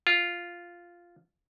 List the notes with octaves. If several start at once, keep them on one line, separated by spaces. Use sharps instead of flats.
F4